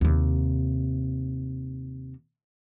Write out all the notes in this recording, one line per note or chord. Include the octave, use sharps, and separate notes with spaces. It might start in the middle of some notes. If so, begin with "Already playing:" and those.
D#2 C3